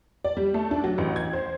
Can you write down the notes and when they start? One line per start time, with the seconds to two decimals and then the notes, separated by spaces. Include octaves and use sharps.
0.25 D5
0.37 G3
0.54 A3
0.71 D4
0.84 F#3
0.98 A1
1.16 G#6
1.33 C5